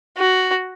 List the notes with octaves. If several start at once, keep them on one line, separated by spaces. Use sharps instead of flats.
F#4